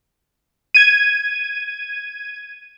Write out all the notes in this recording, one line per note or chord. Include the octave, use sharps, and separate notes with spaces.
G#6 D#7